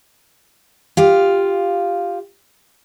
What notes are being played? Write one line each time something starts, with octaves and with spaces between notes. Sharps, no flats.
F4 G4 F5